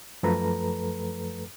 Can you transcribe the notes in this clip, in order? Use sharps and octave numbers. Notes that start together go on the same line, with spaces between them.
F#2 F3 A3 A4 B4 A#5